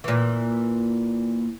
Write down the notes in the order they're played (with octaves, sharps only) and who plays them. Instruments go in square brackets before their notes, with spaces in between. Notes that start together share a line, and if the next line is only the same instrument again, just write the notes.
[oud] A#2 E3